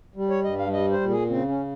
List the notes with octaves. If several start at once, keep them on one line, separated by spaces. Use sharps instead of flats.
G3
C#5
G2 D#5
F5
G3 D#5
C5
A#2
G#4
C#3 C4
C#4